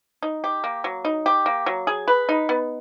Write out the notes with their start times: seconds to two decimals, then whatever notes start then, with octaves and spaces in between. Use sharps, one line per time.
0.22 D#4
0.44 G4
0.64 A#3
0.84 F#3
1.05 D#4
1.26 G4
1.46 A#3
1.66 F#3
1.87 G#4
2.08 B4
2.29 D#4
2.49 B3